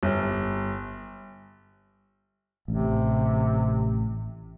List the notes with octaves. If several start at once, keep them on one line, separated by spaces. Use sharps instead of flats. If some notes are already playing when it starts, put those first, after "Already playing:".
G1
A1 C3